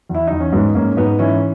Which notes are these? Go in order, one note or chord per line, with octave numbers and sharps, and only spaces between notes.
E2
E4
E2 D#4
C#4
G#2 G#3 B3
G#2 A#3 C#4
G#2 B3 D#4
E3 C#4 E4